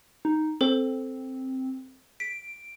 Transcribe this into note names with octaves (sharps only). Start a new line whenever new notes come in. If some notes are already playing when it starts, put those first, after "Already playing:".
D#4
C4 A4 C5
B6 D7